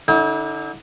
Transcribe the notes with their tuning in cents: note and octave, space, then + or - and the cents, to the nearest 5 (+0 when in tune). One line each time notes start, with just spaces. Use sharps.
D3 +0 E4 -45